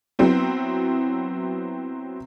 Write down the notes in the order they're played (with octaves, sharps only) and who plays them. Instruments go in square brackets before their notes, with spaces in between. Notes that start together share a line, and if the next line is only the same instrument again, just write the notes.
[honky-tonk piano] F#3 B3 C4 E4